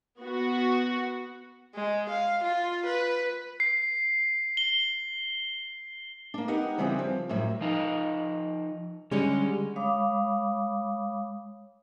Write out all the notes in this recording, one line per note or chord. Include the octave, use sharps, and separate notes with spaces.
B3 F#4
G#3
F5
F4
B4
C7
G7
A#3 D4
B3 D#4 G4 A#4 F#5
C#3 E3 G3 B3 C4
F3
F#2 A2 F#3 G3
F3 D#4 B4
D3 G3 G#3 C#4 C#5
G#3 C#5 F5 B5 D6 D#6